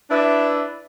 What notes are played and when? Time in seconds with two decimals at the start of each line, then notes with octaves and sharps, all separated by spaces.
0.10 D4 E4 B4 D5 E5